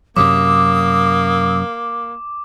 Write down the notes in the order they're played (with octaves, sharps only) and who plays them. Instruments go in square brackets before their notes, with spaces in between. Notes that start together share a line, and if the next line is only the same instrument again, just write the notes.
[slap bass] F#2 C3 F#3 [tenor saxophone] A#3 [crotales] D6 [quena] D#6